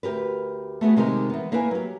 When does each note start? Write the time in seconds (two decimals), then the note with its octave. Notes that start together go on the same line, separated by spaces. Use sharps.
0.03 D2 G4 A#4 B4
0.81 A3 B3 F#4 G#4
0.96 C3 D#3 G#3 D#4 G4 A#4
1.30 E3 B3
1.52 A#3 E4 A#4 B4 F5 G#5
1.71 F#3 G4